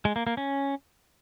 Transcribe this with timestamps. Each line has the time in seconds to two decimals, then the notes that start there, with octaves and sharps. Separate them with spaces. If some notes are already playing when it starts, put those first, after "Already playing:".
0.05 G#3
0.16 A#3
0.27 A#3
0.37 C#4